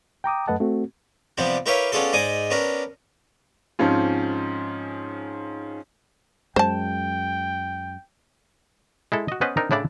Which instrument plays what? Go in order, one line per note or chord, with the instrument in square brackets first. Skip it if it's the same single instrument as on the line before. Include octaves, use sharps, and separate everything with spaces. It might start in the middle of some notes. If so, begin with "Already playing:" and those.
[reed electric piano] G5 A#5 D6 D#6
F#2 A3 B4 D#5 F#5 A5
A3 C4 F#4
[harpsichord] C3 F3 G3 B3 D4
E4 G4 A#4 B4 C#5 F5
B3 C#4 D4 F4 G#4 A4
G#2 D#4 D5 G#5 D#6
B3 C#4 D4 A#4
[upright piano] G#2 F3 C4 C#4 F4
[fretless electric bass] F#2 G#3 [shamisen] C5 A5 [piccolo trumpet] G5
[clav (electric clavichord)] G#3 E4 A4
F#4 D#5
B3 C#4 B4 C5 D#5
C4 D4 D#4 A#4
A2 C#3 D4 E4 D5